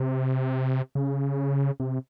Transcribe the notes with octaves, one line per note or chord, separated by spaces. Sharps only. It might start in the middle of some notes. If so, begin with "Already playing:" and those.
Already playing: C3
C#3
C3